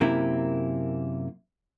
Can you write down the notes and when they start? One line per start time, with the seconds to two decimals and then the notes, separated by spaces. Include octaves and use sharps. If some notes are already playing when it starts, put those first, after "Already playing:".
0.01 F#2 C3 A#3 E4